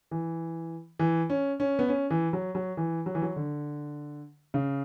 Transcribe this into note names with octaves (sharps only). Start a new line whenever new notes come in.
E3
E3
C#4
C#4
B3
C#4
E3
F#3
F#3
E3
F#3
E3
F#3
D3
C#3